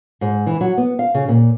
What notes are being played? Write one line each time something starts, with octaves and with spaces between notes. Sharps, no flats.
G#2
E3
F#3
B3
F5
C#3
A#2